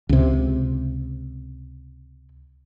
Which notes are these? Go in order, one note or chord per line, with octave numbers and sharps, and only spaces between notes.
C#2 C3